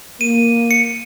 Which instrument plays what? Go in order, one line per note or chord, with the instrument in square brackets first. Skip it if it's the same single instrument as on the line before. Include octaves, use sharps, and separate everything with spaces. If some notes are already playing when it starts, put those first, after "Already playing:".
[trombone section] A#3 [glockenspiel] D#7
[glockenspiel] C#7